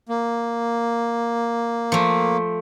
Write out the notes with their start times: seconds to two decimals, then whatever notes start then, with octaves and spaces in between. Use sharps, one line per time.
0.09 A#3
1.92 F3 A3